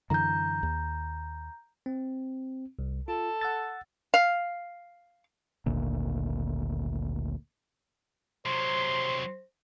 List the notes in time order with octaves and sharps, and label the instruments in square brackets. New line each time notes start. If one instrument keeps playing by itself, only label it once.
[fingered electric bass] F#2 D3 E3 [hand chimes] A#5 G6
[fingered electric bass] D#2
[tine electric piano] C4
C2
[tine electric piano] F4 [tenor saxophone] A4
[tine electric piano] F#5 E6 A6
[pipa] F5
[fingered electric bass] G#1 D2 A#2
[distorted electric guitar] C3 F#3 [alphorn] C5 [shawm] C6